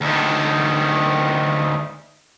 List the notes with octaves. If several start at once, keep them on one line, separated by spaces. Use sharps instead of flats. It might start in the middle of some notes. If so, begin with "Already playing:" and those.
D2 D#3